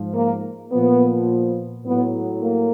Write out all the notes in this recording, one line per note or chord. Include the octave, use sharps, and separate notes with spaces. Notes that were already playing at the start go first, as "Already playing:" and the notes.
Already playing: G#2 F3
A#3
A#2 F3 B3
A2 F#3 B3
A#3